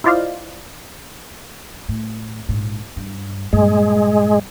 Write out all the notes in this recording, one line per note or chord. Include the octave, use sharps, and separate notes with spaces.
E4 F4 C5 D5 D#5 F5
A2
A#1 G#2
G2
G2 A#2 G#3